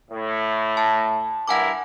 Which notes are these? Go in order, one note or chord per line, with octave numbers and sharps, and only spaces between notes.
A2
A5
G2 E4 A#4 F#5 G#5 D6